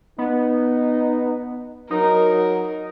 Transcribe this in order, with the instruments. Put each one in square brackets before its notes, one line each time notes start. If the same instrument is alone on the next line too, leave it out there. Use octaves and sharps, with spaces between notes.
[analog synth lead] B3 [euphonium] D#4
[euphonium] F#3 [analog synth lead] D#4 [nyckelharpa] A#4